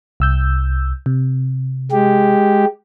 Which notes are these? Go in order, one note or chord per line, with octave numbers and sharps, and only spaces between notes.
C2 E6 G6
C3
G#3 G4